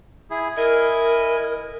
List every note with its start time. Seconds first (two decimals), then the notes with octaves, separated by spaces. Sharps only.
0.30 E4 G#4
0.57 E4 A#4 D#5 G#5